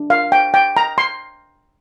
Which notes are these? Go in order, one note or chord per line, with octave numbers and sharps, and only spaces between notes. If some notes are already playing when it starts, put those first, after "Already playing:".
Already playing: D4
F5
G5
G5
A#5
C6